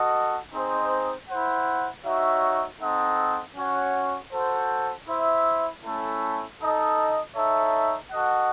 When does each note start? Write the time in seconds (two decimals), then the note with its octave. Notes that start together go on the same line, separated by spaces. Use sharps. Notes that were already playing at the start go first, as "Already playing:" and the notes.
Already playing: F#4 A4 D#5
0.53 C4 D#4 G#4 C5 D#5
1.28 E4 C5 F#5
2.04 D#4 F#4 C#5 E5
2.80 C4 D#4 A4 D#5 F#5
3.56 C#4 F#4 C#5 F#5
4.32 F#4 A4 C5
5.08 E4 C5 E5
5.83 A3 C#4 E4 A4
6.60 D#4 A4 D#5
7.35 D#4 A4 C#5 E5
8.11 F#4 A4 D#5 F#5